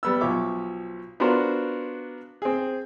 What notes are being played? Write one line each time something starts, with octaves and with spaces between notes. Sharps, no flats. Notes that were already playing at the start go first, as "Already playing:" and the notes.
G3 B3 E6
B1 F3 C#5 E5 D6
B3 D4 F4 F#4 A#4 C5
C4 G#4